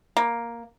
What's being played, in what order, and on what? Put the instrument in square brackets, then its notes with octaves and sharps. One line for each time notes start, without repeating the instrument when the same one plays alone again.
[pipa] A#3